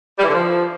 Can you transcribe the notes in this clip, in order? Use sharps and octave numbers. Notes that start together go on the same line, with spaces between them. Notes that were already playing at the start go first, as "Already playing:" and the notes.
G3
E3
D3
F3